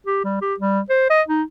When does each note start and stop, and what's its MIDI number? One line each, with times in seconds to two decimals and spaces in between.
0.06 0.22 67
0.24 0.40 55
0.42 0.54 67
0.60 0.80 55
0.90 1.06 72
1.10 1.22 75
1.28 1.42 63